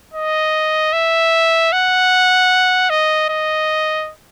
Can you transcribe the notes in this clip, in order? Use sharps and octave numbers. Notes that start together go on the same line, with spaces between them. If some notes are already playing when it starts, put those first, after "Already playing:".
D#5
E5
F#5
D#5
D#5